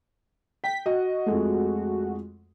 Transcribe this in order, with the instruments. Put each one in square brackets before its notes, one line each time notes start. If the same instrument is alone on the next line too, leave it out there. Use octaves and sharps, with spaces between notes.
[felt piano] G5 [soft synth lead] B6
[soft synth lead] F#4 [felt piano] D#5
[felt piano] F2 G#3 A3